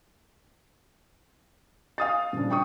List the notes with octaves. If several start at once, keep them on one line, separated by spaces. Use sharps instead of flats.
F5 D#6 A6
D#1 C#3 D4
D4 G5 C#6 D#6